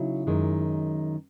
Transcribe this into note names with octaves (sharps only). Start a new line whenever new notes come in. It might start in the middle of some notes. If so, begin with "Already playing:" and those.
Already playing: C#3 F#3 D#4 E4
F#2 D#3 G#3